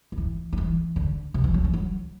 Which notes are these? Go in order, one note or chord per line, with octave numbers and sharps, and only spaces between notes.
D3
E3
F#3
E3
D3
C3
E3
F#3
E3
F#3